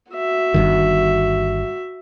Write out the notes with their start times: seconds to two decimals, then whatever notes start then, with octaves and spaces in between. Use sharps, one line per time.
0.11 F#4 E5
0.54 G1 G2 D#3